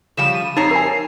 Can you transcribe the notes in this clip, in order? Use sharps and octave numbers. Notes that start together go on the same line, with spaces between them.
C#3 F3 G3 E7
D#7
F2 D#4 C#5 A#5 C7
A#4 G#5